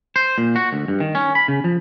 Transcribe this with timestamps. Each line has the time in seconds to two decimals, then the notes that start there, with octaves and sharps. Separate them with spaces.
0.16 C5
0.38 A#2
0.56 F#4
0.73 D2
0.88 G2
1.00 D#3
1.15 C#4
1.35 B5
1.48 C#3
1.64 F3